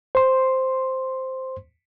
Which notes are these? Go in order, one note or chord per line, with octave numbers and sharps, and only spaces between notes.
C5 C6